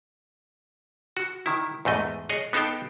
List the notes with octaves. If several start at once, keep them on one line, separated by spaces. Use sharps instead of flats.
F#4
D#3 E4
E2 G#2 A3 D#5
G#4 C#5 D#5
B3 D#4 A4 F5 G5